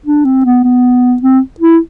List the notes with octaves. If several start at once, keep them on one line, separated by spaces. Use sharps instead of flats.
D4
C4
B3
B3
C4
E4